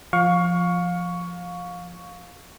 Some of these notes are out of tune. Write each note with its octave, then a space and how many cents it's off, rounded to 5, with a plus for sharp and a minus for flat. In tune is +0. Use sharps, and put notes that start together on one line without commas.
F3 +0 F5 +25 C#6 +10